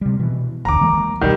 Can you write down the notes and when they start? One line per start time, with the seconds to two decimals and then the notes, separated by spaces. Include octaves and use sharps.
0.01 C3 G3
0.19 B2 E3
0.65 F#1 D2 A#5 D6
0.81 E3 G#3 A#3
1.21 E1 B1 D#3 G3